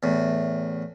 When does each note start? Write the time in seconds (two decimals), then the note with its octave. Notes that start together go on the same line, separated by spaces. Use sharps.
0.03 E2 A2